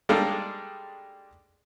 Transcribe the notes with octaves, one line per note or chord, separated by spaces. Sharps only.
G3 G#3 A#3 D4 D#4 A4